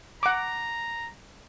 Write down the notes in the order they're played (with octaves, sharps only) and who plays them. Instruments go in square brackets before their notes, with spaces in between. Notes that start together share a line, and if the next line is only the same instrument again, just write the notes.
[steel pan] F#5 D6 [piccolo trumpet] A#5